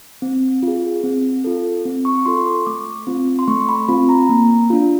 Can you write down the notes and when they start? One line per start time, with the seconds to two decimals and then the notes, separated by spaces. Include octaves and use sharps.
0.22 C4
0.63 F4 G#4
1.03 C4
1.44 F4 A4
1.85 C4
2.05 C#6
2.26 F4 A4 C6
2.46 D6
2.62 C#6
2.66 A3 D6
3.07 C4 F4
3.39 C6
3.48 A3 C#6
3.69 B5
3.89 C4 F4 B5
4.09 A#5
4.29 A#3
4.70 D4 F4